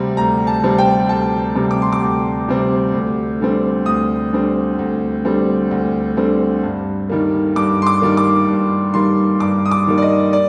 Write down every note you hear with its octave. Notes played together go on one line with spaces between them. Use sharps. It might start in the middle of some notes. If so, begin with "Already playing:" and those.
Already playing: D2 C3 G3 C4
D2 A#5
A5
C3 G3 C4
G5
D2 A5
C3 G3 C4
D6
C6
D6
D2
C3 G3 C4
D2
D3 G3 C4
D2 D#6
D3 G3 C4
D2
D3 G3 C4
D2
D3 G3 C4
G2
D#3 G3 A#3
G2 D6
C6
D6
D#3 G3 A#3
D6
G2
D#3 G3 A#3 C6
G2 D6
D#6
D6
D#3 G3 A#3
D5
D#5
D5